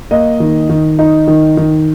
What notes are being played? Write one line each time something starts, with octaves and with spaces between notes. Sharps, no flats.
A#3 D#5
D#3
D#3
D#4
D#3
D#3